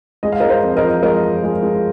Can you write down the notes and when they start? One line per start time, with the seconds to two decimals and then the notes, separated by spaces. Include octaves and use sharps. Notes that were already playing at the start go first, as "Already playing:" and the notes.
0.23 G#3 D#5
0.32 F5
0.40 G#3 A#4 D#5
0.49 C5 F5
0.63 F2
0.77 A#4 D#5
0.83 F3
1.03 G#3 A#4 D#5
1.22 F3
1.43 G#3
1.63 G#3